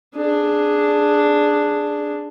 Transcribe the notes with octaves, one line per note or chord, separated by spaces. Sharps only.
D4 G#4